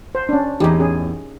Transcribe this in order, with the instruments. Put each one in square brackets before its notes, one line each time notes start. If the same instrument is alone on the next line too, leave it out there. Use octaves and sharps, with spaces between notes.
[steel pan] C5
C#4 D4
[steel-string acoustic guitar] E2 A2 [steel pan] D#4 G4 G#4
[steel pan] C#4 G#4